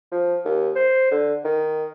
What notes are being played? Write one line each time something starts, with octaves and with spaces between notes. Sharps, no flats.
F3
D#2
C5
D3
D#3